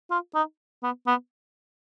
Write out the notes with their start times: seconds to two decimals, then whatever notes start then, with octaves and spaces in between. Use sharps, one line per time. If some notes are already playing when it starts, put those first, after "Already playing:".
0.11 F4
0.35 D#4
0.83 B3
1.07 B3